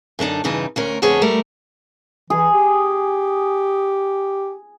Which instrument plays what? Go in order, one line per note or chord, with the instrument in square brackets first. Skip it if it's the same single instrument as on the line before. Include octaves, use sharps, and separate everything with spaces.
[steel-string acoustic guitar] F#2 D3 D4 D#4
E2 G2 C#3 E3 D#4
D2 C#4 A#4
F2 D3 B3 G#4 C#5
G3 A3 A#4
[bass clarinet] E3 [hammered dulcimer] G#4
[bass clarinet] G4